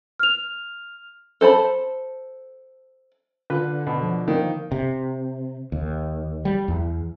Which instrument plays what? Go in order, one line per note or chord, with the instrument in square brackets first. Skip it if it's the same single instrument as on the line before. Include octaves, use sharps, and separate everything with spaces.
[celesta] F6 F7
[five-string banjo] A4 C5 A5 B5
[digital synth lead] D3 [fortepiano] F4 B4
[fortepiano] B2
[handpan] F3
[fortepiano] D#3 [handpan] A#3
[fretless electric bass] C3
D#2
G3
E2